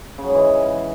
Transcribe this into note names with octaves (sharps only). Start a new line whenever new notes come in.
C#3
F#3
G#2
E3